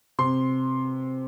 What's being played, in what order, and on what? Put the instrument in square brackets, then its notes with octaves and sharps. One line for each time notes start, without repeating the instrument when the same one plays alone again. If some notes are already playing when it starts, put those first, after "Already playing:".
[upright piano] C3 C6